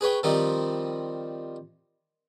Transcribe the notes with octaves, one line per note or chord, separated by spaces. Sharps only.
G#4 B4 C#5 G5
D#3 F3 G3 C4 D#4